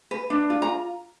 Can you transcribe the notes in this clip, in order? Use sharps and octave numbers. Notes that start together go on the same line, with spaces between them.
B4
D4
F4
A#5